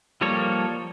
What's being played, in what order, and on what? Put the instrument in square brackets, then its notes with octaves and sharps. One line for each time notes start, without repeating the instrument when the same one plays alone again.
[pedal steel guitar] F3 G3 A#3 A4 C#5